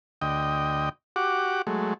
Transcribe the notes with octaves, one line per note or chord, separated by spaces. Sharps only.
D2 D#5 G5
F#4 G4 F#5 D6
F#3 G#3 A3